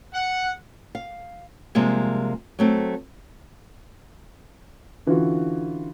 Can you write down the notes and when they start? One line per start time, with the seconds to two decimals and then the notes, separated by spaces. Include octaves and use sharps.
0.14 F#5
0.95 F5
1.75 C3 F3 G3 G#3 A#3
2.59 F#3 A3 C4
5.07 D3 E3 C#4 F4 F#4